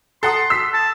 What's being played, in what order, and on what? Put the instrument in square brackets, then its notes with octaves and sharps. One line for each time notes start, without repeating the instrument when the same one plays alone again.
[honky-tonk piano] A4 F#5 D#6 [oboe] C6
[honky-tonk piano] E6 B6
[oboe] A5